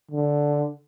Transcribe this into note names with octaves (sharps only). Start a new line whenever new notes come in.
D3